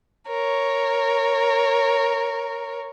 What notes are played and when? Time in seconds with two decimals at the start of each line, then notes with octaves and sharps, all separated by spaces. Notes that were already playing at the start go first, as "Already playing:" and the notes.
0.28 A#4 C#5